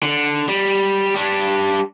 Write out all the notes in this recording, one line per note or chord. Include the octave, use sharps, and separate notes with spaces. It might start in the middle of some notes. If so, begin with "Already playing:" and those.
D3
G3
G3 D4